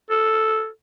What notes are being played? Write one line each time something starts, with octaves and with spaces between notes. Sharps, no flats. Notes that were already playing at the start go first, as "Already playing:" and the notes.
A4